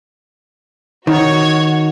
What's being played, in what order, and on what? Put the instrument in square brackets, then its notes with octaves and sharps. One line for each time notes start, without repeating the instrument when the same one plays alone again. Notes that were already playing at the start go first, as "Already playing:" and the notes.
[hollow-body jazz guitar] D#3 [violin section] F#4 C#5